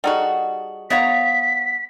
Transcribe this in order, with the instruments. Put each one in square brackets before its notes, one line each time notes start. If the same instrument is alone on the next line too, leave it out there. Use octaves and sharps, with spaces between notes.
[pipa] G3 D#4 F#4 [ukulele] G#4 A4 F#5
[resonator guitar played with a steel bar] B3 C#5 A#5 [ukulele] C5 E5 F5 [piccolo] B6